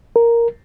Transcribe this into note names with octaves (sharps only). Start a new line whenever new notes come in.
A#4